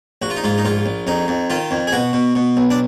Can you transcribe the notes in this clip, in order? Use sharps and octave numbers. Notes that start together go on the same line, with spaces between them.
A#1 F#4
F4
D#4
G#2 F4
D#4
A#1 F4
A#1
F2 D#4
F2
D#3 F4
F2
G#4
B2 F#4
B2
B2
B1
D4